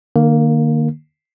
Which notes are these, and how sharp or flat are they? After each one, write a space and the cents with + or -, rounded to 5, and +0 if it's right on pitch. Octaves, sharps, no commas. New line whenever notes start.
D#3 -45 A#3 +0